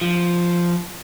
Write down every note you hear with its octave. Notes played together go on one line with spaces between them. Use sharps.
F3